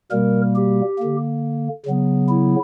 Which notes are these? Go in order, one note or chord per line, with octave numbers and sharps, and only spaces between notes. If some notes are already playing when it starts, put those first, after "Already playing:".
B2 G3 A#3 A#4
G4
D3 A#3
C#3 F#3 B3
E4